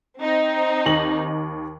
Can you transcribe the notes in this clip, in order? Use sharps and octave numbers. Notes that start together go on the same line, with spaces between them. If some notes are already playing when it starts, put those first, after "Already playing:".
C4 D#4
D#2 A#6 F#7